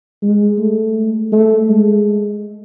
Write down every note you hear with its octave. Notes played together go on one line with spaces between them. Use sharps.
G#3
A3
A3
G#3